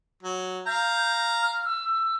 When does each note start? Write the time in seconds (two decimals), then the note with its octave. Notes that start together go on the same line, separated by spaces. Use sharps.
0.23 F#3
0.66 F5 A#5 G6
1.42 F6
1.65 E6